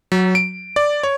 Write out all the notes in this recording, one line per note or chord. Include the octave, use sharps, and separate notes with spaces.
F#3
D7
D5
C#5